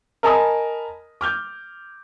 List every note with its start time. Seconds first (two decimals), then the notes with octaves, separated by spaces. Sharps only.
0.23 A#4 D#5 G#5 A5 B5 D#6
1.21 D6 F6 G6